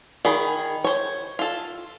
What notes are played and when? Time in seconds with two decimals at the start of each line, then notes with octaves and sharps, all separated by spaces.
0.25 D#3 G#4 B5
0.84 C5 C#5
1.39 F4 A4